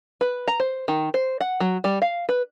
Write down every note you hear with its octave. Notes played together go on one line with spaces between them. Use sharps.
B4
A#5
C5
D#3
C5
F#5
F#3
G3
F5
B4